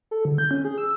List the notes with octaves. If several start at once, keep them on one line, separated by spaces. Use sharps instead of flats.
A4
D3
G6
C#4
G#4
E6